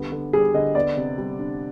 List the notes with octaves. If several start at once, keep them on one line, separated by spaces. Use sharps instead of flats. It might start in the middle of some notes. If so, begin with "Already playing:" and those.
Already playing: D3 G3 B3
D3
G3 G#4
D3 D#5
B3 D5
C3
G3
D4